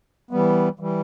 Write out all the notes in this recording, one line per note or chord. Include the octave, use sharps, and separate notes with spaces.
E3 G3 B3
E3 G3